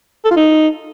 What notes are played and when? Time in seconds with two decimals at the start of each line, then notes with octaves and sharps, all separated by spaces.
0.25 A4
0.31 F4
0.37 D#4